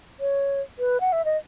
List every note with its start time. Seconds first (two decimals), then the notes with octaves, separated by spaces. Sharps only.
0.20 C#5
0.79 B4
1.00 F#5
1.12 E5
1.25 D#5